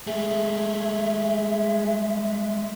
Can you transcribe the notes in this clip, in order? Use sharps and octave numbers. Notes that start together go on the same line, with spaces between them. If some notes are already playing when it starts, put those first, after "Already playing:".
G#3 A3 G#4 E5